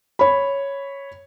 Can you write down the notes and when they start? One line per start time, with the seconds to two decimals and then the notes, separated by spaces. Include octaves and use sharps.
0.19 C#5 B5